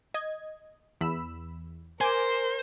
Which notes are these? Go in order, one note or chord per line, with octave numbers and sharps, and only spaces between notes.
D#5 G#6
E2 B5 E6
A#4 C5 G#5 D6